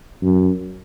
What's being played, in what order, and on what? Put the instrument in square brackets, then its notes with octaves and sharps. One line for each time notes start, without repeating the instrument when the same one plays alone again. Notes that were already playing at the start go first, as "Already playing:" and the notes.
[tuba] F#2